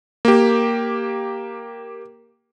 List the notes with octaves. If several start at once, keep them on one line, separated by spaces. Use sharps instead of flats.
A#3 G4